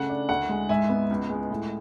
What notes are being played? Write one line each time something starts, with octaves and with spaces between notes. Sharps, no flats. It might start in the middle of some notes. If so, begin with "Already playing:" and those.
Already playing: C#3 A3 F#5
D4
D2 F#5
G#3
G#2 E5 G#5
B3
C#2
G#3
A2